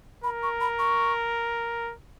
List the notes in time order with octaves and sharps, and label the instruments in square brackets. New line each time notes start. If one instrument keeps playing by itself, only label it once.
[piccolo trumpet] A#4 [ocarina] B5
[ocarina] C#6
B5
C#6